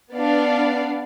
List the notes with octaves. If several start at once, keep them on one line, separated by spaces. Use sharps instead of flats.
B3 D4 D5 F5